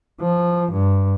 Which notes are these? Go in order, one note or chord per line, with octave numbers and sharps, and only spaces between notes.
F3
G2